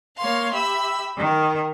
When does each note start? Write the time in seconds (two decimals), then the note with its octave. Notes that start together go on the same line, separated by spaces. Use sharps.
0.17 A#3 C#5 F5 C6
0.53 G4 E5 B5 E6
1.17 D#3 A#4